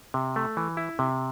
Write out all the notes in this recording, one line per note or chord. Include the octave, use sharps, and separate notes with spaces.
C3
A3
E3
E4
C3